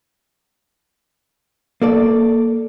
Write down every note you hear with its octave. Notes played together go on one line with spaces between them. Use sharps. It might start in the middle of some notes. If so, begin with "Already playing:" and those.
A#3 A4 D5